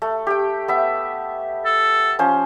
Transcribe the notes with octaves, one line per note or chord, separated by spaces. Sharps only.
A3
G4 G5
B3 E5
A4
F3 C#4 C5